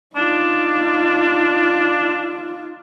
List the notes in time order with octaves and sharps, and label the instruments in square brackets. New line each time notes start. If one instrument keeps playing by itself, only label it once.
[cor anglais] D4 [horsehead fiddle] D#4 F4